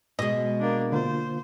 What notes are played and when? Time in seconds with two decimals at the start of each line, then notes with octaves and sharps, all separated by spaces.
0.19 B2 G#3 D#5
0.60 A#3 D4
0.92 D3 A#3 F4 C5